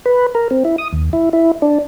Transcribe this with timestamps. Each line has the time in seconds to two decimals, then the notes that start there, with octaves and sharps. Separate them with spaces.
0.06 B4
0.35 A#4
0.51 C4
0.65 E4
0.78 D#6
0.93 D#2
1.13 E4
1.33 E4
1.62 D4